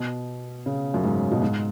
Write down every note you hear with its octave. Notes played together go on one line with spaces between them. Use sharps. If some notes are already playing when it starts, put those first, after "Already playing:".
Already playing: B2
C#3
F#2
G#2
B2
G#2